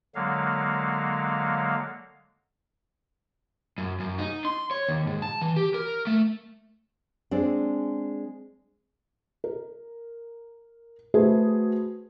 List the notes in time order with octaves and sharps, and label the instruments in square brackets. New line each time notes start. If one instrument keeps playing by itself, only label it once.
[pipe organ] D3 F#3 G#3 A#3 F5
[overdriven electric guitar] F#2
F#2
D#4
C6
C#5
D#2
G#2
A5
E3
G4
A#4
A3
[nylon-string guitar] G#3 C4 D4
[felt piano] A#4
A3 F#4 G#4 B4 C5